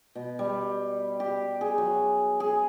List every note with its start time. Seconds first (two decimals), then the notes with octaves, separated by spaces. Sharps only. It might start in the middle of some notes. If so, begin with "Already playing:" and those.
0.15 B2
0.39 G3
1.20 G4
1.61 G#4
1.78 F#3
2.40 G#4